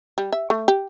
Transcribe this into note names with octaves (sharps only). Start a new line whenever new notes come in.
G3
E5
A3
G4